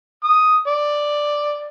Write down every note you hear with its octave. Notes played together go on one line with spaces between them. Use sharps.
D#6
D5